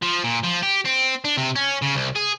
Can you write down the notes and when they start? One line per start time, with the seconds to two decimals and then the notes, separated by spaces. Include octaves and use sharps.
0.02 F3
0.24 A#2
0.44 F3
0.63 G4
0.85 C4
1.25 D4
1.37 C3
1.56 C#4
1.82 C#3
1.95 C2
2.16 G#4